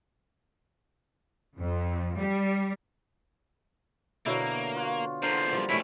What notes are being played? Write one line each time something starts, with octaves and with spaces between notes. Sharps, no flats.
F2
G3
B2 D3 F#3 A#3 E4 C#5
F4 F#4
E2 A#2 D3 A#4 C5
F3 G3
B2 G3 A3 C#4 E4